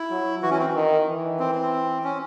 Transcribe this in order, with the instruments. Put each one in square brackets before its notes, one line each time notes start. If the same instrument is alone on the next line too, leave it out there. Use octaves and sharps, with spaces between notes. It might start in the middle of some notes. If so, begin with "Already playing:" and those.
Already playing: [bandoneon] E4
[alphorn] F#3
[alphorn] E3 [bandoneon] F#4
[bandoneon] C#4
C4
[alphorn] D#3
E3
[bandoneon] C4
C4
C#4